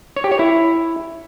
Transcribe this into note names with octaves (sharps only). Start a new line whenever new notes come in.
C#5
G4
C#5
E4